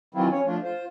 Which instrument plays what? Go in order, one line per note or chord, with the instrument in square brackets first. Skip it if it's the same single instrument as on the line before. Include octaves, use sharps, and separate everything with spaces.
[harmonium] D#3 E3 F#3 C4 E4 F4
C#4 C#5
F3 A3 D4 F4
F4 C5